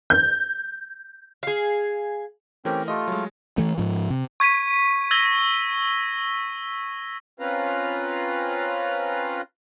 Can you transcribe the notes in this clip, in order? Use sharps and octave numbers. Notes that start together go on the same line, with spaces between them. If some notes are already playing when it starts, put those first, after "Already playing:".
G6
G#4 F5
E3 A3 C4 C#4 G4 A#4
A3 F4 G4 D#5
F#3 G#3
E3 A3
G#2 F3
C3
C#6 G#6 B6 D#7
E6 G#6 A#6 G7
C4 C#4 F4 B4 F5 A#5